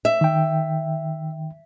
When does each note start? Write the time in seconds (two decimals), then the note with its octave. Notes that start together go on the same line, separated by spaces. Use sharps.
0.05 E5
0.21 D#3 G5